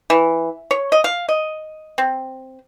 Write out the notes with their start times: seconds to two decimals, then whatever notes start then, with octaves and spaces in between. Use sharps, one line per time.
0.10 E3
0.71 C#5
0.92 D#5
1.04 F5
1.29 D#5
1.98 C4